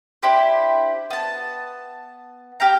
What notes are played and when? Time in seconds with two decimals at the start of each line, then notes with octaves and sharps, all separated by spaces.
0.23 D4 E4 G4 C5
1.10 B3 A5
2.60 G4 F5 G5 A#5